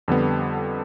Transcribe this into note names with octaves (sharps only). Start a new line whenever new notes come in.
F2 D3 G3 B3